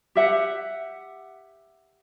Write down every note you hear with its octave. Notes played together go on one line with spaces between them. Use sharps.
G4 E5 F#5